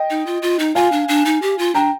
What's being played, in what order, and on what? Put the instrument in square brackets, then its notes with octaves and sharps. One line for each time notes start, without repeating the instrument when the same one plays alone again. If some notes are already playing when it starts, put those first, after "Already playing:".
Already playing: [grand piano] D#5 G5
[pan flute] D#4
F4
F4
D#4
[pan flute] F4 [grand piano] F5 G#5
[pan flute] D4
D4
D#4
G4
F4
[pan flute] D4 [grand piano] G5 A#5